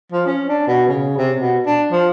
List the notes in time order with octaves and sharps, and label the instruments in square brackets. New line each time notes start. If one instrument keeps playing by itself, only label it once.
[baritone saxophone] F3
C#4
D4
B2
C#3
C3
B2
D4
F3